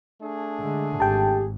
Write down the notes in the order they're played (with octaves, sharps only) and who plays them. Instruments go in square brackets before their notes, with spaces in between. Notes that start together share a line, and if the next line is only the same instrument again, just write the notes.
[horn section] A3 D4 G#4
[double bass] D3 [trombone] G#3
[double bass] G#1 [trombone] G4 [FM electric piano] G5 A5